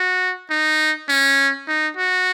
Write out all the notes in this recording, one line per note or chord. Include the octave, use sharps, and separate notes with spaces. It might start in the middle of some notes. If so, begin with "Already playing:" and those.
Already playing: F#4
D#4
C#4
D#4
F#4